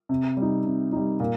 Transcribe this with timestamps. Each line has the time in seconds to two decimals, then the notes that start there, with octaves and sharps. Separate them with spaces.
0.09 C3
0.37 G3
0.42 D#4
0.66 C3
0.92 G3 D#4
1.20 A#2